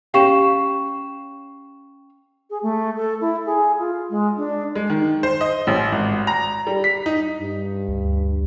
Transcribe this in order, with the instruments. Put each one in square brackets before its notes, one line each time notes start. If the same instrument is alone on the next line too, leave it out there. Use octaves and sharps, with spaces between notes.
[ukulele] C#4 G4 F5 [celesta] G5 C#6 E7
[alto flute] G#4
A3
A4
E4
G#4
F4
G#3
D4
[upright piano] G#3
D#3
C5
D#5
A1
G#1
A#5
G3
B6
D#4
[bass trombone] G2
[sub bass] D2